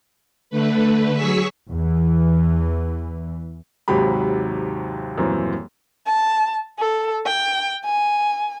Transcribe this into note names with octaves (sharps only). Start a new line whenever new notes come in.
D3 A3 B4
F#3 G#4 C#6 E6 B6
E2 E3
D#2 G#2 C3 F#3 G4 B5
D#1 F#2 E3 C4
A5
A4
G5
G#5